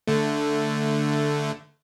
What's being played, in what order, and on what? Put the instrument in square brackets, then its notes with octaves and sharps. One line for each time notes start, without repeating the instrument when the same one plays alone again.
[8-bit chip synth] D3 A3